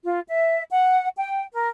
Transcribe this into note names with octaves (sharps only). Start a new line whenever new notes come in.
F4
E5
F#5
G5
A#4